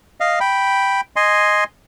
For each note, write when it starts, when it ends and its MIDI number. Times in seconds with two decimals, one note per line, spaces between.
0.20 0.39 75
0.20 0.39 77
0.40 1.01 79
0.40 1.01 83
1.16 1.64 75
1.16 1.64 80
1.16 1.64 84